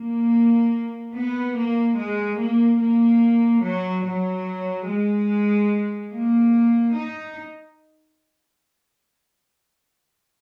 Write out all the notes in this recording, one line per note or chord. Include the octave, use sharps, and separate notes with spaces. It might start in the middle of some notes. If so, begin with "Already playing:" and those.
Already playing: A#3
B3
A#3
G#3
A#3
A#3
F#3
F#3
G#3
A#3
D#4